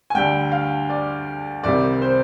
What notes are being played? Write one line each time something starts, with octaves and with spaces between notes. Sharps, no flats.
G#5
D2 D3 G3 G5
F5
D5
C2 C3 D#3 G3 D5
C5